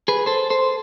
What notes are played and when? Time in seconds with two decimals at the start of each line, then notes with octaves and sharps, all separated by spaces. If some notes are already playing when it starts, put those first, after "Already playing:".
0.08 G#4 B4
0.26 A4 C5
0.50 A4 C5